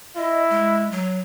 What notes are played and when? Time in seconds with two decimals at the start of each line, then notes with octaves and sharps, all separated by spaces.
0.17 E4 D#5
0.50 G#3
0.91 F#3